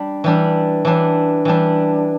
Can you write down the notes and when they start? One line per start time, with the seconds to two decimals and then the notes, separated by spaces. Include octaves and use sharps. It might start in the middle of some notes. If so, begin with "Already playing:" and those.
Already playing: G3 D4
0.24 E3 G3 D4
0.85 E3 G3 D4
1.45 E3 G3 D4